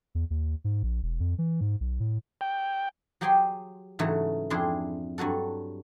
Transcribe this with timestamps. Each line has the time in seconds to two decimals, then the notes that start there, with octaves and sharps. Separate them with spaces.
0.15 E2
0.30 D#2
0.64 G#2
0.83 A#1
1.03 E1
1.20 F2
1.38 E3
1.61 G#2
1.80 B1
2.00 A2
2.41 G5
3.21 F#3 G4 G#4 G5 G#5 C6
3.99 G#2 C#3 E3 F#3 A3
4.50 F2 D4 E4 G#4 C6
5.18 G2 F#3 F#4 A4